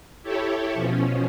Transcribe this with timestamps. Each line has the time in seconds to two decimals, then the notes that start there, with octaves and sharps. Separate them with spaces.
0.23 E4 G4 A4 C#5
0.75 B2 F3 C#4